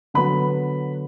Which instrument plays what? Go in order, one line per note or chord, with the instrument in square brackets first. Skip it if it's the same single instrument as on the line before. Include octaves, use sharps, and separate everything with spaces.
[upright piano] D3 F#3 B3 B4 B5